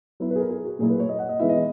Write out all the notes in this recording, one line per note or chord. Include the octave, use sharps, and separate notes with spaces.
F#3 B3 E4
B4
G#4
A#4
G#4
F#4
A#2 F#3 A#3 E4 G#4
B4
C#5
D#5
F#5
D#5
E3 G#3 B3 E4 E5
D#5